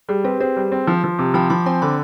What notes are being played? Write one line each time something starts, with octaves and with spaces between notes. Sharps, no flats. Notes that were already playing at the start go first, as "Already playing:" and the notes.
G3 G#4
C4 G4 B4
C4 G#4 C5
G3
C4
F3
F3
C3
F3 G5 B5
F3 B5 D6
C4 G#5 C6
D3 B5 D6